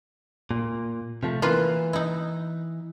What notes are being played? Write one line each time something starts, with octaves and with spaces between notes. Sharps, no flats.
A#2
C3 F3 A3
E3 A#3 F4 B4
D#4 E4